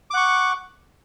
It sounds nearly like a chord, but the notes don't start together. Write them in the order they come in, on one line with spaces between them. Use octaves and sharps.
D6 F#5 C#6